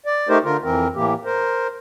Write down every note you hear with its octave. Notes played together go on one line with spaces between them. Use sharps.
D5
A3 D#4 G4 A#4 C5
D3 F4 A#4
F2 E3 C4 A#4
A2 E3 A#3 G4
A#4 C5